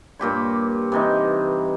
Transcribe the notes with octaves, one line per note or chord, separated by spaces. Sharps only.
G2 A#2 G4 C#5
C3 E3 D#4